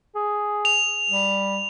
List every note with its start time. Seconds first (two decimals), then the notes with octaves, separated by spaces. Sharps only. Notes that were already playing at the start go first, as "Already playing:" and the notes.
0.16 G#4
0.65 F7
1.10 G3